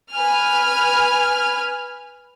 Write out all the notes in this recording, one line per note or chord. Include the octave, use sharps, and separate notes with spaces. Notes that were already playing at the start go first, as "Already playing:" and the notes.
B4 G#5 F6